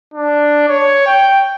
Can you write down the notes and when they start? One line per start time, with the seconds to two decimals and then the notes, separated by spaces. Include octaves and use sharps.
0.14 D4
0.69 C#5
1.07 G5